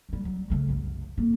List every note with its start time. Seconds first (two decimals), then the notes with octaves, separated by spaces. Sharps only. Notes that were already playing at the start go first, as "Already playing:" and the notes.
0.09 D#3 G3
0.25 F#3 G3
0.50 C#3 A3
0.69 C2 F#2
1.17 F2 A#3